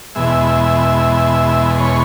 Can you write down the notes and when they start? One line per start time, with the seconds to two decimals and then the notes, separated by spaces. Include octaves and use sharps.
0.15 E2 B2 G#3 E5
1.80 C#5